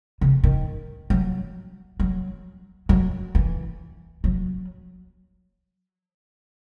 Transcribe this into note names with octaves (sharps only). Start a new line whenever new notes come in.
C#3
D#3
F#3
F#3
F#3
E3
F#3